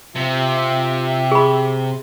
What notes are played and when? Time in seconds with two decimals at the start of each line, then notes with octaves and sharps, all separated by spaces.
0.16 C3 F4 G4 E5
1.32 G#4 B5